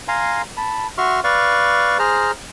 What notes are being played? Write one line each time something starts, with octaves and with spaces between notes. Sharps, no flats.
F5 G#5 A#5 C6
A5 B5
F#4 E5 C6 C#6 F6
B4 D5 F5 C#6
G#4 C5 A#5 F6